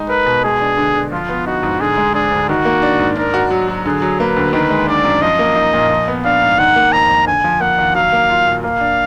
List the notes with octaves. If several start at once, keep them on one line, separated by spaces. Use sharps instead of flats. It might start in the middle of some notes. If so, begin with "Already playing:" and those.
Already playing: G#3 D#4
A#4 B4
B2
G#3 G#4
D4
D3
D3
F3 F4
B3
D#4 F#4
G#2
D3 G#4
G#3
D4 G#4
D2
D#3 F#4
A#3
D4
G#2
D4 A#4
F#4
F#3
F#3
D3 G#4
F#3
A#3 B4
D2
D#3 B4
G#3
D4 D5
F#2
F3 D#5
A#3
D#4
A#2
F3
B3
D4 F5
G#2
D#3 F#5
A#3
F2 A#5
F2
D3 G#5
F3
A#3 F#5
D#2
F#3 F5
A#3
F4
A#2
A#3 F5
D4